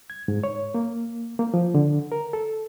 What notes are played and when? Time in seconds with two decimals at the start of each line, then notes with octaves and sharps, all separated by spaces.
0.10 G#6
0.28 G#2
0.44 C#5
0.74 A#3
1.39 A#3
1.54 F3
1.75 D3
2.12 A#4
2.33 A4